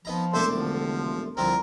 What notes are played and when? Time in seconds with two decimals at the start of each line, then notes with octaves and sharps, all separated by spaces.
0.05 F3 B3 D#4 A#5
0.34 E1 C2 A3 A4 C5 E5 D6
0.51 D3 F3
1.37 C2 D3 F3 C4 A#4